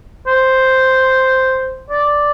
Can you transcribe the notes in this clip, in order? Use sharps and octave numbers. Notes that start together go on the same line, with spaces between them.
C5
D5